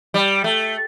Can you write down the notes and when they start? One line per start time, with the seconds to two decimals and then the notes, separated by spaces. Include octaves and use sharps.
0.14 G3
0.44 A3